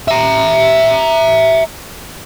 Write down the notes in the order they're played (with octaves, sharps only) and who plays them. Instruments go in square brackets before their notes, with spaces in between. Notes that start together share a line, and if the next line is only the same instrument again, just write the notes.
[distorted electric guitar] E5 A#5